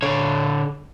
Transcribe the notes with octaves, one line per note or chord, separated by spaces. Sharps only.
D3 C#5